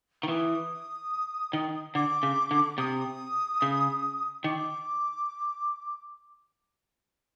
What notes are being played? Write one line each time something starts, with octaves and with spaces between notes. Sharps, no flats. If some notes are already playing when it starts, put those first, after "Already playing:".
D#3
E3 D#6
D#3
D3 D6
C#3
D3
C3 D#6
C#3
D#3 D6